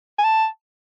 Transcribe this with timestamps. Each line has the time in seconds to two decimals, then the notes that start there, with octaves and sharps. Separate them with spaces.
0.18 G#5
0.24 A5